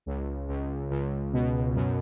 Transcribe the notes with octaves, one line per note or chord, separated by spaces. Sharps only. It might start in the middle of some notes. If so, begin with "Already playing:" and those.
C#2
C#2
C#2
B2
F#2